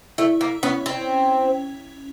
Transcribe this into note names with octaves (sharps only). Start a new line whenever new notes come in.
A3 E4
A#3
B3 C#4
C4